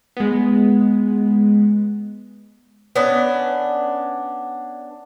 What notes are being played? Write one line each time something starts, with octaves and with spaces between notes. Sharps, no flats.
G#3 B3
B3 C#4 D4 D5